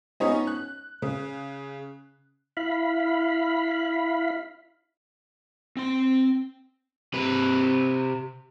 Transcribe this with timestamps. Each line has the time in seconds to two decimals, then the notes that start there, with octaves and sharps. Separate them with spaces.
0.20 B3 C#4 D#4 C#5 D#5
0.47 F#6
1.02 C#3
2.57 E4 F5 B5
5.77 C4 C6
7.14 C3 B4